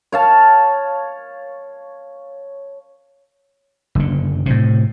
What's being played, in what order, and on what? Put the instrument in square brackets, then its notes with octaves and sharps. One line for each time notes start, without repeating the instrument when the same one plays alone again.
[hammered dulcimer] C#5 F5 A5
[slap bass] F#1 D3
A2 C3